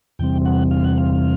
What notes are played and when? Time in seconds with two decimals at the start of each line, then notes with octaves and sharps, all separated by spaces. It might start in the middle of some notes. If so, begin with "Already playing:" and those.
0.19 E2 C3 E3 G3 C4 G5
0.45 F#5
0.71 F5
0.84 F#5
0.98 F5